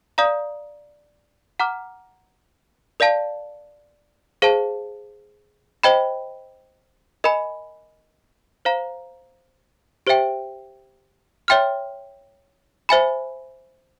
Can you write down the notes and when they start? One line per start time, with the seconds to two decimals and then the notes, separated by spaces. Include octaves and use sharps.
0.18 D5 F5 A#5 D#6
1.60 F#5 A#5 D6 F6
3.00 A#4 D5 F5 A5
4.42 G#4 C5 F5 A5
5.83 C5 D#5 G5 B5
7.24 A#4 D#5 G#5 B5
8.65 C5 F5 A#5
10.07 G4 C5 E5 G5
11.48 C#5 E5 G5 C6 F6
12.89 C5 E5 G#5 B5